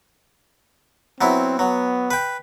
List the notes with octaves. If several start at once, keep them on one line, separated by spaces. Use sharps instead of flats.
F#3 B3 C4 E4
F#3 B3
B4 G5